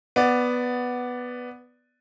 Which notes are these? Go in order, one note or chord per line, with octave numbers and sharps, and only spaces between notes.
B3 D5